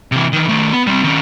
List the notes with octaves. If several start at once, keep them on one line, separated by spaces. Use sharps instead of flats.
C3 E3
D#3 E3
D#3 A3
B3
G3 C4
D#3 C#4